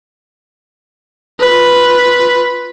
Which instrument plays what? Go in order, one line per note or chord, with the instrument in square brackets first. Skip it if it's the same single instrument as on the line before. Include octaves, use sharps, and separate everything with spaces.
[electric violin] F4 B4